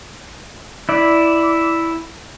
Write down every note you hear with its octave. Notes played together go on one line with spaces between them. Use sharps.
E4 D5